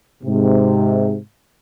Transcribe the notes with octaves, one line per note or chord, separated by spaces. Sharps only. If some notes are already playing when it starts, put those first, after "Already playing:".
G#2 C3